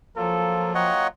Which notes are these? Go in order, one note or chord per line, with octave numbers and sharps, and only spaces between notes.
F3 F#3 A#3 F4 A4
C#5 D#5 F#5 G5